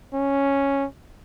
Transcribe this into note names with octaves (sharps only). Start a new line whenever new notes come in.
C#4